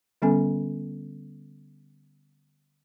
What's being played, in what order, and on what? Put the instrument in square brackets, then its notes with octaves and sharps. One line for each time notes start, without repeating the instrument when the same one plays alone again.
[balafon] D3 G3 B3 C#4 A4 G#5